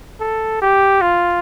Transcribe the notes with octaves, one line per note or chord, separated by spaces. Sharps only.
A4
G4
F4